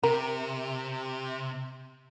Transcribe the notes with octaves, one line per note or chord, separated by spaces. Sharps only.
C3 A#4